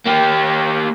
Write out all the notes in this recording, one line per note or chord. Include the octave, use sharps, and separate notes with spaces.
A#3 G4